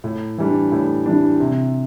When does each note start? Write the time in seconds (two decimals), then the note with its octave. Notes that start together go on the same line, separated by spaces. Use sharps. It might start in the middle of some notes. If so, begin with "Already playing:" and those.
0.04 A2
0.38 E3 G3 D4
0.72 A2
1.06 E3 G3 D4
1.40 C3